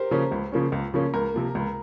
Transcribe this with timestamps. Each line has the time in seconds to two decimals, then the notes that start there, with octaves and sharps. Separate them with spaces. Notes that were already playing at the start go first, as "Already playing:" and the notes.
Already playing: G4 A#4 C5
0.11 C#3 F3 A#3 C#4
0.32 C#2
0.52 C#3 F3 A#3 C#4
0.72 C#2
0.94 C#3 F3 A#3 C#4
1.14 C#2 A#4
1.34 C3 F3 A#3
1.55 C#2